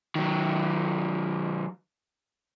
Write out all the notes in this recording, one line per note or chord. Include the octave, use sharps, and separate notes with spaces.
D#3 F#3